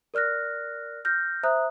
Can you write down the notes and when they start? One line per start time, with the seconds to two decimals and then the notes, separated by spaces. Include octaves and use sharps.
0.14 A#4 D5 F6 F#6 A#6
1.05 F6 G6 A#6
1.43 C5 E5 A#5 D#6 F#6